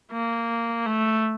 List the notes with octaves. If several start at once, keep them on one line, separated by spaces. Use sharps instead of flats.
A#3
A3